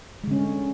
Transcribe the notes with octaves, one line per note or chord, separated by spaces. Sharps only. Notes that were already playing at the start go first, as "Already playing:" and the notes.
D3 G#3 C#4